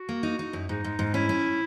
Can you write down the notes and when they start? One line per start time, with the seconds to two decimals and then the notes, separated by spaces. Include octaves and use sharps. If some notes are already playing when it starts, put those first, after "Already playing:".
Already playing: F#4
0.09 A#3
0.23 D#4
0.39 D#4
0.53 F#2
0.69 G#2 D#4
0.84 G#2
0.99 G#2
1.14 C#4 E4
1.29 C#4